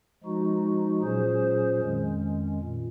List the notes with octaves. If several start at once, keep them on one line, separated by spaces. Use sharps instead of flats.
F3 G#3 D#4 F#4
A#2 F#3 C#4 G#4 C5
F2 D#3 G#3 C#4
A#2